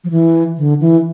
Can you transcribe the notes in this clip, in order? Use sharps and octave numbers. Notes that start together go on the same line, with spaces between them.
F3
E3
D3
E3